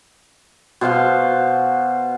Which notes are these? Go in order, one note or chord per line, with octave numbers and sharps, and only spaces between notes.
B2 C5 F5 F#5